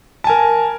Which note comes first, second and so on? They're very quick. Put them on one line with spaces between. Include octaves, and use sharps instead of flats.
A5 G#5 A#4